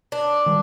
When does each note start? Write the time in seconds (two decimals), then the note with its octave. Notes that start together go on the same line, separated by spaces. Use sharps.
0.12 D4
0.46 D#3 G3